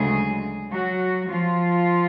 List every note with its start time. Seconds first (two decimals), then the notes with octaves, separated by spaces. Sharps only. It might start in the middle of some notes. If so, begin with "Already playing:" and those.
Already playing: D2 C#3 F#3 G#3 G#4
0.71 F#3 F#4
1.28 F3 F4